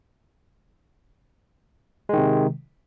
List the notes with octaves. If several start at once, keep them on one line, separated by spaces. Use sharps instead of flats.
C3 D#3 G#3